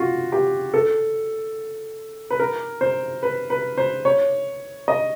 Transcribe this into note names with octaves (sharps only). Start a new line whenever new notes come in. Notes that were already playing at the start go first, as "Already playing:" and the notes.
Already playing: F4 F#4
G4
A4
B4
A#4
C5
B4
B4
C5
C#5
D#5